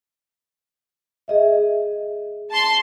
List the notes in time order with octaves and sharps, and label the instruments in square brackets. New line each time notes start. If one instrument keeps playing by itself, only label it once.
[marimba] G#4 D#5 E5
[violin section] A5 C6